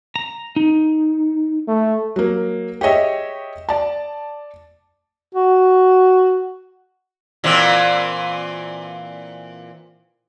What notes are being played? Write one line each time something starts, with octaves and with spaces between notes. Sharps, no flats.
A#5
D#4
A3
F#3 A#3
G4 G#4 C#5 D#5 E5
D5 A5
F#4
A#2 E3 C4